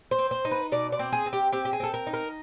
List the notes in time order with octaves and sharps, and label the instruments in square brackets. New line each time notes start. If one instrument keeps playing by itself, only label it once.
[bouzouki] C5
C4
C5
D#4
B4
B2 D5
D5
C4
G#4
C4
G4
C4 G4
G4
G#4
C4 A4
A#4
D#4
A#4